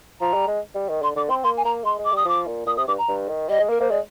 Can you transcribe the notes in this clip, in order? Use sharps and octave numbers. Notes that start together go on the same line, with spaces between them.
F3 A#5
G3
G#3
G3
D#3
D3 C6
D3 D6
C4 C6
A#3 C6
G#5
A#3 A#5
G#3 C6
G#3
D6
G3 D#6
F3 D6
A#2
A#2 D#6
C3 D#6
G2 D6
A#5
G2
D#3
G3 D#5
G#3
A#3 A#4
A#3 C5
G#3 D5